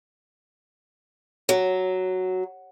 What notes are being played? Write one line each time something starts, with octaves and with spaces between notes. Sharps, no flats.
F#3